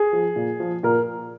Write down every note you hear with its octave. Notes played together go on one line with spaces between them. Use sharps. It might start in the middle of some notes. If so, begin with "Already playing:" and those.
Already playing: G#4
F3
A#2
F3
A#2 A#4